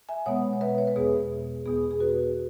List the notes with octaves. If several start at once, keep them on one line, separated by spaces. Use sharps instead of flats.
E5 G#5
B2 G#3 B3 C#5 F#5
C#5
B4 E5
C#5
B4
E2 B2 B3 G#4
E2 B2 B3 G#4
G#4
F#4 B4